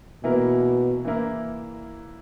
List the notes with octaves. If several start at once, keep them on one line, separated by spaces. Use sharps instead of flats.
B2 E3 A#3 E4 A#4
E3 A#3 E4 A#4